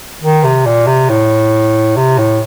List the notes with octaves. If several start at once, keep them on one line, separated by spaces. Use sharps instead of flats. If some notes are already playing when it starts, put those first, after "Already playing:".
D#3
C3
A#2
C3
A2
C3
A2